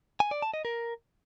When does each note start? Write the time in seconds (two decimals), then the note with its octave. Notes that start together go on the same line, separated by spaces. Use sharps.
0.20 G#5
0.31 D5
0.42 A5
0.54 D#5
0.65 A#4